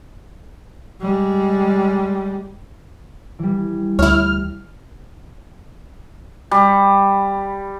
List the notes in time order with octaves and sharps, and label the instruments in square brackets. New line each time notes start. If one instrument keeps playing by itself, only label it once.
[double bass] G3 G#3
[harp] E3 G3
[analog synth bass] D2 [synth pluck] E4 C#5 [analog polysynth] F6
[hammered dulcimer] G3